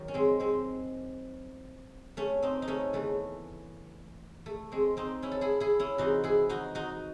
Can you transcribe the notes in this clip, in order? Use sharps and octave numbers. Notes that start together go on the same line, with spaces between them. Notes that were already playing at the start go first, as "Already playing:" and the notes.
Already playing: F#2 D#3
C#4
G#3 C4
G#3 C4
A3 C#4
C4 D#4
D#4
A3 C#4
E2 C#3 E3 A3
A3
G#3 C4
C4 D#4
C#4 E4
A4
E4 G#4
E4 G#4
C#4 E4
C3 E3 G#3 D#4 F#4
E4 G#4
D#4 F#4
D#4 F#4